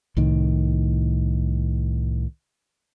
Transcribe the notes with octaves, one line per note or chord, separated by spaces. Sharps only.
C2 A2 D#3